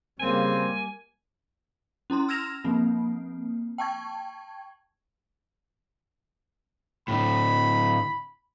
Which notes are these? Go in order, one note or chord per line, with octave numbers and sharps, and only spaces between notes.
C#3 G3 A#3 C4 G#5
C#4 E4 A#5 C6
E6 F6 G#6 A#6 E7 F7
F3 A#3 C4
G5 A5 C#6 G#6
A2 D3 B5